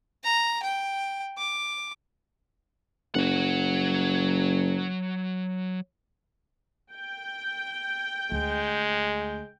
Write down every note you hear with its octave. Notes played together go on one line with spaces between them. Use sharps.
A#5
G5
D6
F#1 F#3 F#5
G5
D2 G#3